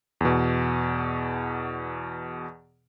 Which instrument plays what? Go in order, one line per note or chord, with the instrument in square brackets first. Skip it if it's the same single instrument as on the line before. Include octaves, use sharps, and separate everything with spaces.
[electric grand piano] E2 B2